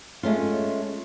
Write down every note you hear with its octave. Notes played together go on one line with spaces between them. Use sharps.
G#3 A3 C#4 F4